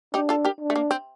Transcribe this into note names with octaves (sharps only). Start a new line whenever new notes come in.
D4 D#4 G4
F4 A4
G4 A#4
D4
A3
A#3
C4